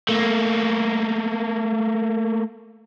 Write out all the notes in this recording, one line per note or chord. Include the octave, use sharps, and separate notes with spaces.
A3 A#3